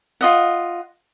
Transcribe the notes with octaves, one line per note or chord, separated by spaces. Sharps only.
F4 D#5 F#5